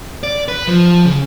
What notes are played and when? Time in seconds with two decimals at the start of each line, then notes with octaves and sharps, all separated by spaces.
0.23 D5
0.48 B4
0.68 F3
1.05 C#3